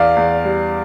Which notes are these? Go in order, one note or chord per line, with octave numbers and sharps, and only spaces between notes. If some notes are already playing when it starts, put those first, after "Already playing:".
Already playing: E2 D5 F5
E2
G3